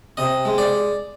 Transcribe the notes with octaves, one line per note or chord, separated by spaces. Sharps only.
C3 D#5
G#3
D5